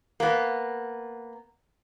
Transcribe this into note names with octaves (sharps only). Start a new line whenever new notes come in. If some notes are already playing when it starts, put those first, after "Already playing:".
A#3 B3